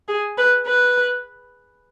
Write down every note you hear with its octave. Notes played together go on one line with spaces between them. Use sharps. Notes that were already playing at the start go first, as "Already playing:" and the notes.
G#4
B4
B4